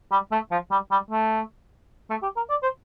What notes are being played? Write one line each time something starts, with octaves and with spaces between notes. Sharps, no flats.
G3
A3
F3
G3
G3
A3
A3
G4
A#4
D5
C5